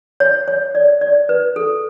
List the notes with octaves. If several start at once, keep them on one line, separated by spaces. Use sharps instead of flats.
C#5
C#5
D5
D5
B4
A4